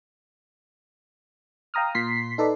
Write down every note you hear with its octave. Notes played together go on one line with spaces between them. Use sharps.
F5 G5 A#5 D#6 F6
A#2 C6 B6 C7
D#4 A4 B4 D5